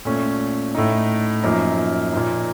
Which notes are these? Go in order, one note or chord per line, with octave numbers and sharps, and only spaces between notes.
A#2 A3 C#4
A2 A3 D#4
F#2 F3 A#3 D#4
A#2 F3 A#3 D#4